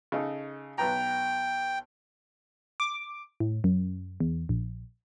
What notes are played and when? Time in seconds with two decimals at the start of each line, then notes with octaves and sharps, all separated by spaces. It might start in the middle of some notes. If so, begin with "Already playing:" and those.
0.12 C#3 D#4 A4
0.78 B1 B4 G5 A#5
2.80 D6
3.40 A2
3.64 F#2
4.20 E2
4.49 A#1